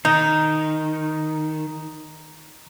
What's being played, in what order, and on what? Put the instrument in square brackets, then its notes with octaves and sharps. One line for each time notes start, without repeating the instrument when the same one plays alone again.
[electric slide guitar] D#3 [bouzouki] D#4 [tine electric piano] A#5